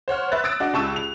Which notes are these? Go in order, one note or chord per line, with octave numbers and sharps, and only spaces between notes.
C5 C#5 F#5 F6
B4 E5 F#6 A6
D#6 E6 A6 D7
D4 F#4 D5 D#5
C#2 G4 A5 C#6 E6 D#7
F7